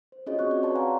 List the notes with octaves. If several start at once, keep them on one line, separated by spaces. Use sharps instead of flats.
C5
C#4 F4 F#4 G#4 C#5 D#5
C4 F#4 C#6 F#6
D5 E5
B4 C#5 A5 C6
F5 F#5 G#5 A#5